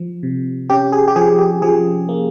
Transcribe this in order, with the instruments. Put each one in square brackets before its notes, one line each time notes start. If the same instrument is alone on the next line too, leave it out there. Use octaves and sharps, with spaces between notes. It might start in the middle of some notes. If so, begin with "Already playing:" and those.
Already playing: [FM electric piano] F3
C3
C#4 G4
G#4
G4
F3 G#4
G4
F3 G#4
A#3